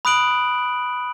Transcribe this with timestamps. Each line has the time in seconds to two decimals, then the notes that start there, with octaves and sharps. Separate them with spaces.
0.05 B5 D#6 F#6 D7 F#7